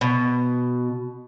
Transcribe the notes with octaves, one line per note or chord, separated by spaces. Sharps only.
B2